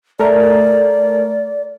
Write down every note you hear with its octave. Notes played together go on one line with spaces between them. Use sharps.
A3 A#4 D5